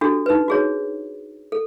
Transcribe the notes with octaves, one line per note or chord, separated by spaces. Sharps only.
D4 F#4 G4 A4
D#4 B4
F#4 G#4 C#5
A4